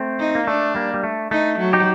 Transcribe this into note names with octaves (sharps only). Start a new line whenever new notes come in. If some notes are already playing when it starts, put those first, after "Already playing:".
Already playing: A3 C4
D#4
A#3
A3 D4
G3 A#3
G3
A3
A3 D#4
F#3
D#4 G4